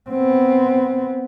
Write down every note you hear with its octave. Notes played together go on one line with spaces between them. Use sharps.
B3 C4